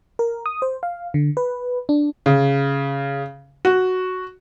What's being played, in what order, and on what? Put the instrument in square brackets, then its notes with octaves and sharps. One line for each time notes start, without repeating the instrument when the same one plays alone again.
[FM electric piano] A#4
D#6
C5
F5
D3
B4
D4
[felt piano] C#3
F#4